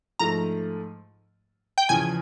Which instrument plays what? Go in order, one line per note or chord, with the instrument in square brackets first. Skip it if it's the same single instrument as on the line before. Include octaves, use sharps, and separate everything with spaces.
[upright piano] G#2 F3 A3 [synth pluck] A#5
[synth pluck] G5
[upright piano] E2 C#3 F3 [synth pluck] G#5